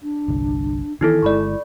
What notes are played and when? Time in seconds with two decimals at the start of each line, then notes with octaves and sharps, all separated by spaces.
0.02 D4
0.28 G1 C2
1.01 D#3 E3 B3 D#4 E4 A4
1.23 G1 G#3 E4 D5 B5 C#6